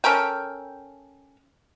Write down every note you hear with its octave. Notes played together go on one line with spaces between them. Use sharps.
C#4 A4 A#4 G5